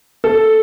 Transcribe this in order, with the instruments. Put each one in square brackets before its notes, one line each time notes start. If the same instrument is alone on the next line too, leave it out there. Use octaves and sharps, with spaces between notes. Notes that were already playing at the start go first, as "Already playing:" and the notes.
[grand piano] A4